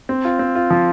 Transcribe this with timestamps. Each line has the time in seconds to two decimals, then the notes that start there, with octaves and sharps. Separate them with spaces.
0.09 C4
0.25 F4
0.39 C4
0.55 F4
0.70 F3